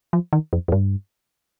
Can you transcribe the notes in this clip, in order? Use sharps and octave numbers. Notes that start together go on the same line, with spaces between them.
F3
D#3
F2
F2
G2